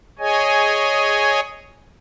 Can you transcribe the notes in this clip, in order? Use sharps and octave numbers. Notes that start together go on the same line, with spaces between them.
G#4 C#5 D#5 G#5